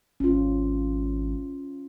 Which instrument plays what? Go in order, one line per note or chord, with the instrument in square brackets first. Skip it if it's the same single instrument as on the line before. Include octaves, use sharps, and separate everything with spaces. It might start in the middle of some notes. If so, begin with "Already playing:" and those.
[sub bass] G#1 [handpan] C#4 F4